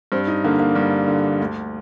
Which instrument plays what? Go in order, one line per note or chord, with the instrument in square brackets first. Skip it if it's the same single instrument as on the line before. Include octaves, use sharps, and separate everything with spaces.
[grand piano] G2 C4
D#4
D3 A#3
A#3
G2 G3
D3
D2